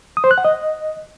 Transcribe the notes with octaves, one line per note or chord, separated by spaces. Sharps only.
D#6
C5
F#6
F#5
D#5